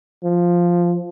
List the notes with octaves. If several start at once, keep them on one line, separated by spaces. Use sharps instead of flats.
F3